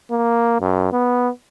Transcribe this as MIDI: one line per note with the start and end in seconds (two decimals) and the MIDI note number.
0.11 0.60 58
0.60 0.91 42
0.92 1.29 59